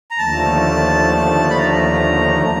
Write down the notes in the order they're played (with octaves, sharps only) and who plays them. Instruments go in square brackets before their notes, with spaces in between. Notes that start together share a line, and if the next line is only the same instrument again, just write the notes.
[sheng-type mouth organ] A#5
[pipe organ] D#2 D3 F3 A3 [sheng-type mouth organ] A5
[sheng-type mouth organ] B5
A#5